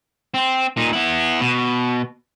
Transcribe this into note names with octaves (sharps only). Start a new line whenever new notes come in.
C4
A#2 D#4
B3 E4
B2